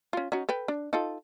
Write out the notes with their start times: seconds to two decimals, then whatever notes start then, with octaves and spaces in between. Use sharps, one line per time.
0.13 C#4 F4
0.32 C#4 D#4 F#4
0.49 A4 B4 G5
0.68 D4
0.93 D#4 F4 A4